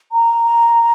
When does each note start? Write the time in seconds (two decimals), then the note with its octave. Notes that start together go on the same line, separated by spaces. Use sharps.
0.12 A#5